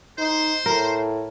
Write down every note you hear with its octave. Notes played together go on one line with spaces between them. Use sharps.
D#4 C5
A2 A#4